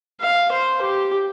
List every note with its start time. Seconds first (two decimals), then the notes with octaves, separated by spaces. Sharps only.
0.21 F5
0.52 C5
0.82 G4